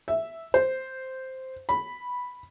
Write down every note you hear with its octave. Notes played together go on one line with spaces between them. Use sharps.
E5
C5
B5